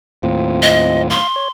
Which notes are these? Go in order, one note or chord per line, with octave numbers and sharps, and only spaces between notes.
D#2 A2 C4 F4
D#5
F5 C6
C#5